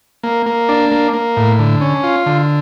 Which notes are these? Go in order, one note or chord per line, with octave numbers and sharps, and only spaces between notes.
A#3
A#3
D4
A#3
A#3
A2
D3
C#4
F4
D3